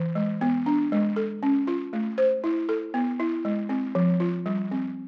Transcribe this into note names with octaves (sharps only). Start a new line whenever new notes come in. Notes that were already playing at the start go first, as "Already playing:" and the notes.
Already playing: E3
G#3
B3
D4
G#3
A4
C#4
F4
A3
C5
E4
A4
B3
E4
G#3
C4
F3
F4
G3
C4